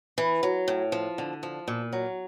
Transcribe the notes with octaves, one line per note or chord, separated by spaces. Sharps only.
E3
F#3
A2
F3
D3
F3
A#2
F#3